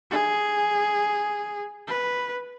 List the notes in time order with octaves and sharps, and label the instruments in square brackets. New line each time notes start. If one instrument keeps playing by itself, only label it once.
[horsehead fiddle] G#4
B4